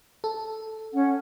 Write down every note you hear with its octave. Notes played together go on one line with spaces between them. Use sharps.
A4
C#4 F#5